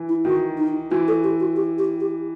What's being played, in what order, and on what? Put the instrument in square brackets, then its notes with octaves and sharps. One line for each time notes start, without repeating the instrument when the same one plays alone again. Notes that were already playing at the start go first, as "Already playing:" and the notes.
Already playing: [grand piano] E3
[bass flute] E4
[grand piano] D#3 [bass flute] F#4
[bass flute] D#4
[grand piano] E3 [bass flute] F#4
[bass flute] A4
G4
F#4
G4
G4
G4